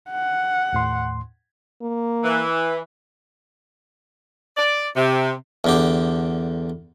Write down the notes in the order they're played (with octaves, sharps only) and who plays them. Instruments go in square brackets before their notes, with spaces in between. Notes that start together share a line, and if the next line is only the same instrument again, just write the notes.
[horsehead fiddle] F#5
[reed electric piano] D#2 A2 C6
[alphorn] A#3
[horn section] E3
[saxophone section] D5
C3
[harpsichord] E2 D3 G4